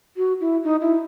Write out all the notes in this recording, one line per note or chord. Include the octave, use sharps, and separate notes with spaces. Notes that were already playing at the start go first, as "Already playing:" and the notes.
F#4
E4
D#4
E4